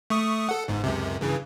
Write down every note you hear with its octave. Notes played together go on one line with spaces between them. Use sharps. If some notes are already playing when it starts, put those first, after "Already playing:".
A3 C#6 D#6
A4 F#5
G1 G#2
C#2 F#2 C3
G2 C#3 E3